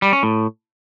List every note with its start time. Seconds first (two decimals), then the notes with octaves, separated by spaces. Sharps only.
0.02 G3
0.13 C#4
0.23 A2